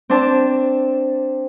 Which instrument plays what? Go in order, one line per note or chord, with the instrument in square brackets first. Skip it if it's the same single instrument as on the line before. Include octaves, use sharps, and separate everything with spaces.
[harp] C4 D4 A5